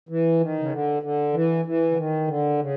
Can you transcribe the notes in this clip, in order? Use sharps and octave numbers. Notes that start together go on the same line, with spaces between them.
E3
D#3
C#3
D3
D3
E3
E3
D3
D#3
D3
C#3